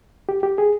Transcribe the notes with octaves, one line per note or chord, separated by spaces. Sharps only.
G4
G4
G#4